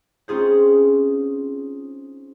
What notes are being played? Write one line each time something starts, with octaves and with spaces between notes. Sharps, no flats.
C4 C#4 D#4 F4 G#4 C5